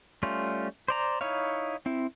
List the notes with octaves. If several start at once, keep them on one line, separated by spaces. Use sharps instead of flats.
G3 A3 C#4 F4
C5 D5 A#5
D#4 E4 C#5 F5
C4 E4